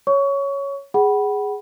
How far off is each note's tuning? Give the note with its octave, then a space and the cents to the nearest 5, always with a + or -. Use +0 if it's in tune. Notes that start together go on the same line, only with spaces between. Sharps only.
C#5 +5 C#6 +25
G#4 +0 F#5 +30 B5 -10